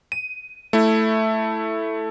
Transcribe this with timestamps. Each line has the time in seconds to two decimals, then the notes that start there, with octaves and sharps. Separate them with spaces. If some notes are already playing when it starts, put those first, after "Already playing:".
0.12 D#7
0.73 A3 E4